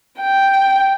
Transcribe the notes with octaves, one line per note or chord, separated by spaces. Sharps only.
G5